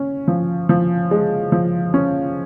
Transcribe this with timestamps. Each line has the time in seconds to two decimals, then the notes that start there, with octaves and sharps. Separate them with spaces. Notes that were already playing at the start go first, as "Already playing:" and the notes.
Already playing: C#4
0.28 F3
0.69 F3
1.11 G#3
1.52 F3
1.94 C#4